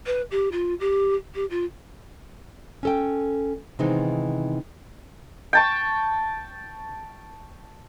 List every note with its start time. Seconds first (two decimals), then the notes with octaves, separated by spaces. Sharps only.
0.06 B4
0.31 G4
0.52 F4
0.80 G4
1.35 G4
1.50 F4
2.83 C#4 A4 G5
3.79 C3 D#3 E3 G#3 B3 D#4
5.53 G5 A5 C#6